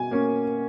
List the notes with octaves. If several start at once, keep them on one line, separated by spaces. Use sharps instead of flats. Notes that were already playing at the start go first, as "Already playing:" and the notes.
Already playing: B2 G#5
A#3 C#4